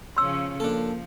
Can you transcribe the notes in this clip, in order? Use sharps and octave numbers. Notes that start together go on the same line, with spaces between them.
C#3 F3 C#4 C6 E6
F3 A#3 D4 A4